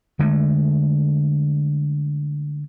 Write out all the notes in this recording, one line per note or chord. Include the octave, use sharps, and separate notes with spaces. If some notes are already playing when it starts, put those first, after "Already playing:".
D3 G#3 A3